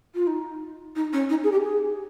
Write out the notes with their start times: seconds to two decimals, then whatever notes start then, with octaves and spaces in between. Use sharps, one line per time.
0.15 F4
0.27 D#4
0.96 D#4
1.13 C#4
1.30 D#4
1.44 G#4
1.52 G4
1.64 G#4